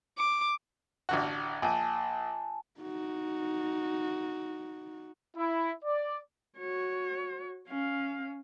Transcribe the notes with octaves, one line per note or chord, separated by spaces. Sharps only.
D6
A1 D3 F#4
A#1 G#5 A5
D#4 F#4
E4
D5
F#4 C#5
C#4 F5